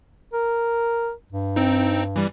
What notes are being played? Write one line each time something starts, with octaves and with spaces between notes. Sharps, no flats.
A#4
G2
C4 D#4
E3 G3